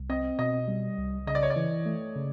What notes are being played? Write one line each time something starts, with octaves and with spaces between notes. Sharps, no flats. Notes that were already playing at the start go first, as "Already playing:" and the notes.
Already playing: C2
C4 D#5
B2 D#5
G3
C2
C#3 D#5
D5
C#5
D5
E3
A3
C#3